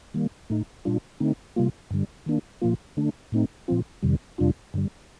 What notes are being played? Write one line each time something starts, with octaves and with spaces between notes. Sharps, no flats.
D#3 G3 A#3
A2 A3 D#4
A#2 G3 D4 F4
D3 A3 C4 D#4
C3 G3 A#3 F4
G2 D3 G3
D#3 A#3 D4
A#2 F3 A#3 F4
D3 A3 D4
A2 A3 C4 D#4
A#2 F3 C4 F4
F2 C3 D#3 G3
F2 C3 G3 D4 F4
G2 D3 G3